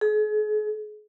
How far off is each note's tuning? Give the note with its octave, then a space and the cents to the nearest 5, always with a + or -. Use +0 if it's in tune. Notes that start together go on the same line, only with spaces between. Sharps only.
G#4 +40